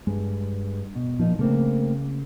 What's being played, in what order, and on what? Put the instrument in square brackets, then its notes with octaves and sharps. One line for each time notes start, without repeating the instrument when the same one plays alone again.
[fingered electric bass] G2 [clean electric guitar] G#3
[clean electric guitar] B2
[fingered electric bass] A#2 [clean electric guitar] F3 D#4
[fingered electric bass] C#3 [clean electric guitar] A3 A#3 C4